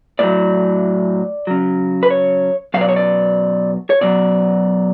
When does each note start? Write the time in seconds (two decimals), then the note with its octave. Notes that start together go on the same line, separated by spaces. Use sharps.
0.19 A2 F#3 D5
1.47 C#3 F#3
2.03 B4
2.10 C#5
2.74 B2 F#3 F5
2.81 D5
2.89 C#5
2.96 D5
3.90 C#5
4.01 B2 F#3 D5